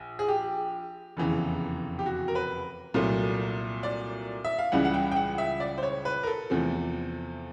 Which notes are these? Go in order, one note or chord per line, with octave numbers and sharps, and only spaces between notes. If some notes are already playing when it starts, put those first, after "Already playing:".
Already playing: A#1
G#4
G4
F1 E2 C#3 E3
G4
F#4
A#4
B4
C2 A#2 F#3 A3
D5
E5
F5
C#2 C#3 E3 G3 F#5
F#5
G5
G5
F#5
E5
D5
C5
C#5
B4
A#4
A4
E2 C3 F3 A3